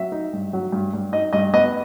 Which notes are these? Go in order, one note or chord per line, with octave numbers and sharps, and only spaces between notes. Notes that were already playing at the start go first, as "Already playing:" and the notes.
Already playing: F#3 E5
D#4
G2
F#3
G2
G2
D#4 D#5
G2 D#5
B3 D#5